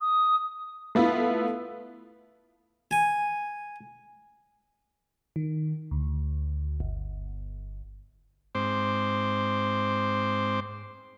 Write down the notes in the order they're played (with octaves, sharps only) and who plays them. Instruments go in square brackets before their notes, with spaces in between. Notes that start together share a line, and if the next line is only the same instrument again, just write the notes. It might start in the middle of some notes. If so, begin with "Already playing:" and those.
[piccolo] D#6
[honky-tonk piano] A3 B3 E4 F4
[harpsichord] G#5
[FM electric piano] D#3
D2
G1
[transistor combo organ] G#2 C4 C5 D6